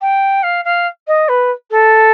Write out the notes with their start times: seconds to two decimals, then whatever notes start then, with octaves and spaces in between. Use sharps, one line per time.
0.01 G5
0.43 F5
0.64 F5
1.07 D#5
1.28 B4
1.70 A4